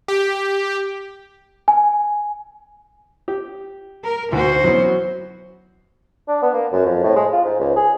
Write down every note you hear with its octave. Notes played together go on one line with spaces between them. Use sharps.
G4
G#5
G4
A#4
D2 G#2 F#4 C5
F#2 E3 B3
D4
B3
A#3
F#2
F2
A2
G#3
F4
G#2
C#2
G#4